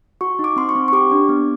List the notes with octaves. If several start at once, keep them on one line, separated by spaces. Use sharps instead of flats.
F#4 C#6
D#4
D6
C4 C6
C#6
C4
C#6
G4 D6
D4
B3